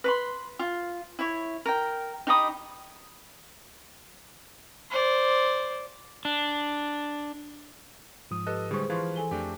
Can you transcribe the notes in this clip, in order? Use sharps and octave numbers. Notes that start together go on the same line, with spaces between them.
B4 B5 C6
F4
E4 C#5
A#4 G5
D#4 G4 B5 D#6
C5 D5
D4
G#2 F3 D#6
G4 A4 B4 D#5 F#6
A2 D3 G3 G#3 G#4 C5 C#6
E3 F3 B4 F5 C6 C#6 G#6
A4 G#5 G7
F2 A3 D4 G4